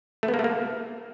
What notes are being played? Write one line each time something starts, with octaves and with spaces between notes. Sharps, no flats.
A3
B3
A#3
A3
A#3